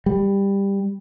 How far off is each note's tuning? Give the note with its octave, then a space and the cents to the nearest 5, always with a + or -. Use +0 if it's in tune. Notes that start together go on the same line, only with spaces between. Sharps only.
G3 +15